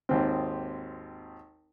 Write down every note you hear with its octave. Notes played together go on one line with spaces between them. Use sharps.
G#1 D#2 C4